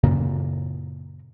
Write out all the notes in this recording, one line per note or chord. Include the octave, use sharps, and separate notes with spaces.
F#2 A#2 C#3 A#3